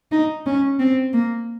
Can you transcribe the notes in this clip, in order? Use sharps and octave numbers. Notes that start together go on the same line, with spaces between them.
D#4
C#4
C4
A#3